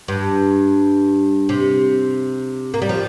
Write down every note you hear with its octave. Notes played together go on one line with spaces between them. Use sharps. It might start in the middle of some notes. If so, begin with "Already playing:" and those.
G2
C3
A#3
G3
F3